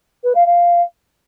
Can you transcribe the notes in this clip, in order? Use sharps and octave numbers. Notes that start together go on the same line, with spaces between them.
B4
F5
F5